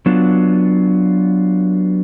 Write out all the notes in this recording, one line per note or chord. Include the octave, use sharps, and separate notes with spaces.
F#3 B3 D4 F4